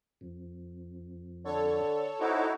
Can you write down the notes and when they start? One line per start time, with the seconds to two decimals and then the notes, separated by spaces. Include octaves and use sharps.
0.21 F2
1.45 D3 A4 C#5
2.20 C4 D#4 E4 F#4 D6